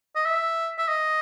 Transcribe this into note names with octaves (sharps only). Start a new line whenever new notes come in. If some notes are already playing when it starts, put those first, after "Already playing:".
D#5
E5
E5
D#5